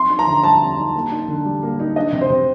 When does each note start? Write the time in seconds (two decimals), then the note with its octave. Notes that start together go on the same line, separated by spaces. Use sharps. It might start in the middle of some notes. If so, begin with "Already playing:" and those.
Already playing: C4 D#4 C6
0.10 D#4
0.19 A#5
0.27 D3
0.43 G3 A5
0.61 C4
0.78 D#4
0.95 A#3
1.12 D#4
1.28 D3
1.45 G3
1.63 A#3
1.79 D#4
1.96 D4 D#5
2.13 C3
2.21 C5
2.30 C3